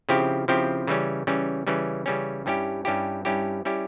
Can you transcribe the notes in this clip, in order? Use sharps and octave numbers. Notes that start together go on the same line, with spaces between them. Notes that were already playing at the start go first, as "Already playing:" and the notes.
C#3 F3 C4 E4 G4
C#3 F3 C4 E4 G4
C#3 E3 G3 C#4
C#3 E3 G3 C#4
C#3 E3 G3 C#4
C#3 E3 G3 C#4
G2 G3 C#4 E4 G4
G2 G3 C#4 E4 G4
G2 G3 C#4 E4 G4
G3 C#4 E4 G4